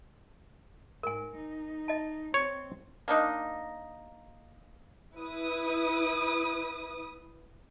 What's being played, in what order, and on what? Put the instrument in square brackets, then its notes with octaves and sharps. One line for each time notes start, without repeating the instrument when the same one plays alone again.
[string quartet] G#2 [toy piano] A#4 G#5
[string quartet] D#4
[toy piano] D#5 A5
[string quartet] C4 [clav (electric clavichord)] C#5
[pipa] A#3 D4 D#4
[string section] E4 B4 D#6